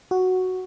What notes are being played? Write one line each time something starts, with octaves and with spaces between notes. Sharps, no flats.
F#4